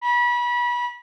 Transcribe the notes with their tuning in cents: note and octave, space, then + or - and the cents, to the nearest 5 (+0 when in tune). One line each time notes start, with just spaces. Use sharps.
B5 -30